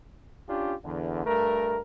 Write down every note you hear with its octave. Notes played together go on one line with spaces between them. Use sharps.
C#4 D4 F4 G4
E2 D3
G2 A3 A#4